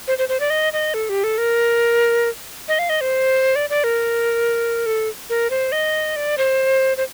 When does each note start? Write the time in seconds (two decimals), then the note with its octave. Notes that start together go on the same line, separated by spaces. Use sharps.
0.08 C5
0.18 C5
0.29 C5
0.40 D5
0.50 D#5
0.73 D#5
0.94 A4
1.09 G4
1.24 A4
1.38 A#4
2.68 D#5
2.79 F5
2.89 D#5
3.01 C5
3.56 D5
3.70 D5
3.84 A#4
4.86 A4
5.30 A#4
5.50 C5
5.72 D#5
6.16 D5
6.38 C5
6.97 C5